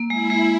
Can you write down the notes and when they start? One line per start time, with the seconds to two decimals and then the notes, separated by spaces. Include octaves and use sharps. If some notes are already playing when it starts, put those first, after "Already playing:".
Already playing: A#3
0.10 G#3 E4
0.30 G#3